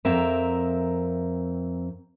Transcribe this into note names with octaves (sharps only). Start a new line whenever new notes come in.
F2 C4 A#4 E5 A#5